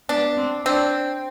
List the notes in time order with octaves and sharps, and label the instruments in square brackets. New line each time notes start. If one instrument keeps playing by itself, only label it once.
[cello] B3 [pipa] D4
[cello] C4
[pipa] C4 [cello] D4